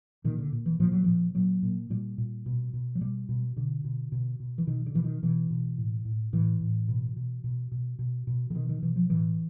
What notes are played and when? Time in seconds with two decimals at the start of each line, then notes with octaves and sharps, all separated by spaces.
0.24 A#2 D#3
0.38 D3
0.52 A#2
0.66 E3
0.80 A#2 F3
0.92 F#3
1.04 A#2 F3
1.35 A#2 F#3
1.63 A#2
1.90 A#2 G3
2.18 A#2
2.46 B2
2.73 B2
2.95 F#3
3.01 B2 G3
3.29 B2
3.56 B2 D3
3.84 B2
4.12 B2
4.40 B2
4.58 E3
4.67 B2 D#3
4.86 D3
4.95 B2 E3
5.04 D#3
5.23 B2 E3
5.50 B2
5.78 A2
6.05 A2
6.33 A2 E3
6.61 A2
6.88 B2
7.16 B2
7.44 B2
7.71 B2
7.99 B2
8.27 B2
8.50 D3
8.54 B2 D#3
8.69 D#3
8.82 B2 E3
8.96 F3
9.10 A2 E3